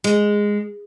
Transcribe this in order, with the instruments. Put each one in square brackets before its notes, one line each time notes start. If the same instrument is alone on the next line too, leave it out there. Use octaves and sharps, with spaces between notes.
[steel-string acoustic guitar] G#3